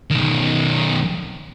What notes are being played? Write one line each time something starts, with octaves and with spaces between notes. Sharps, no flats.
B1 D#3